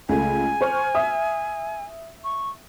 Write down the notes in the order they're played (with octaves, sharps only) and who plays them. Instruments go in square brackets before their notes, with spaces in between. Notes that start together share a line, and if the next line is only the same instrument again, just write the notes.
[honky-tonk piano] C#2 A3 [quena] G#5
[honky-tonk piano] C5 C#6 F6
E5 D#6
[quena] C#6